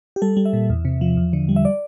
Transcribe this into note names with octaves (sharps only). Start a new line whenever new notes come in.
G4
G3 A4
G3
E5
A#2
E2
C3
F3
E2
D3
G3
E5
D5